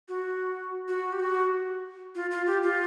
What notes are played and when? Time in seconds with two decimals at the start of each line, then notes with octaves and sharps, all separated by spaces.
0.09 F#4
0.88 F#4
1.13 G4
1.20 F#4
2.15 F4
2.31 F4
2.47 G4
2.63 F4